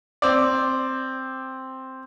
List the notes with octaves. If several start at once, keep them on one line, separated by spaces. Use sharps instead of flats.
C4 D5